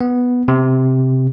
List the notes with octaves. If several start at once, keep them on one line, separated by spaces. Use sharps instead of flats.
B3
C3